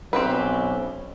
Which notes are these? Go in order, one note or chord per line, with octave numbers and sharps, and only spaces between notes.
B1 C4 C#4 G4 B4